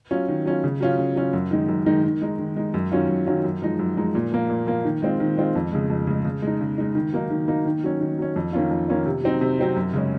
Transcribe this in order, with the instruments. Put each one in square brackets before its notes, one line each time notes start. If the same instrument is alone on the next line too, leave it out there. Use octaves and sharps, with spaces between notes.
[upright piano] F#3 C#4 F4
D#3
F#3 C#4 F4
C#3
F#3 C#4 F4
C#3
F#3 C#4 F4
F#2
D#3 G#3 D#4
F#2
D#3 G#3 D#4
D#3
G#3 D#4
D#3
G#3 D#4
F#2
D#3 F#3 C#4 F4
F#2
D#3 F#3 C#4 F4
F#2
F3 G#3 D#4
F#2
F3 G#3 D#4
A#2
F3 A#3
A#2
F3 A#3
D#3
G#3 C4 F4
D#3
G#3 C4 F4
F2
C#3 G#3
F2
C#3 G#3
C#3
G#3 D#4
C#3
G#3 D#4
D#3
F#3 A#3 D#4
D#3
F#3 A#3 D#4
D#3
F#3 C#4
D#3
F#3 C#4
F2
D#3 A#3 C#4 F4
F2
D#3 A#3 C#4 F4
C3
F#3 C4 D#4
C3
F#3 C4 D#4
F#2
C#3 G#3 C#4